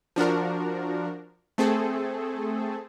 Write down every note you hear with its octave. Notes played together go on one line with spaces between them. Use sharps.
F3 D4 F#4 A#4
A3 C4 G#4 A4